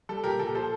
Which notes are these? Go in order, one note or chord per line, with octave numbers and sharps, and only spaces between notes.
G3 A4
A#2 G4 A#4
A#2 A4
F3 A4 C5